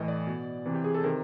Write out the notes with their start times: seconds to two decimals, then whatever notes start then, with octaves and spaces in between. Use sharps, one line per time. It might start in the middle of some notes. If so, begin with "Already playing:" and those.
Already playing: A2 E3 D#5
0.08 D5
0.27 B2
0.66 C3 E3
0.74 G4
0.84 G#4
0.94 A4
1.04 C3 D#3 A#4